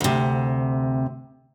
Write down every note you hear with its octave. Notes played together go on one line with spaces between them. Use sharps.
D2 C3